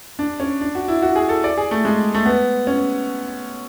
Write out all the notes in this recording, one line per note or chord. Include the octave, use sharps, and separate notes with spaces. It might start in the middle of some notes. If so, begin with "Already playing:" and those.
D4
C#4
D4
F#4
E4
F#4
G#4
A4
D5
G#4
A3
G#3
A3
B3
C#4